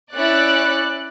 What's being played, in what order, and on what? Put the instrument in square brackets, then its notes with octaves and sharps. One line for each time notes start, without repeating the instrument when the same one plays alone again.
[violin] C#4 E4 [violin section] D5 F#6